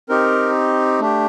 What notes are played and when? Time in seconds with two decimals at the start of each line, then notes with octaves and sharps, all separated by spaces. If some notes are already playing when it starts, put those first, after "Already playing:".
0.09 C4 D#4 G4 A#4
1.00 A3 D4 G4